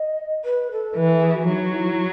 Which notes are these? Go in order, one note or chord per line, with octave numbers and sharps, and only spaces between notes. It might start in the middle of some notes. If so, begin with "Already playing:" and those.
Already playing: D#5
B4
A4
E3 B4
A4
G#4
F#4
F#3 D#4
E4